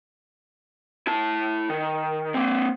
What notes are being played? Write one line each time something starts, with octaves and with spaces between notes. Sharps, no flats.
E4 A5
D#3
A#3 C4